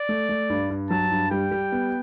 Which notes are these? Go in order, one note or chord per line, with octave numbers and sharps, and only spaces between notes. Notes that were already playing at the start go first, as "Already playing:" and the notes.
Already playing: D5
A3
A3
G2
G2
F#3 A5
G2
G3 G5
G3
B3